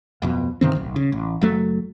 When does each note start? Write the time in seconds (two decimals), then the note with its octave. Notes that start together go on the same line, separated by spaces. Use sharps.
0.22 D1 F2 B2
0.61 G2 C3 D#3 C4
0.75 D1 B1
0.96 C#3
1.12 A1
1.41 F#1 F#3 A3